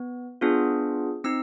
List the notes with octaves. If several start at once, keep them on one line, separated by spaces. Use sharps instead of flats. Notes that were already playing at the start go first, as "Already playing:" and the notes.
Already playing: B3
B3 D4 F4 G#4
C4 D#4 E6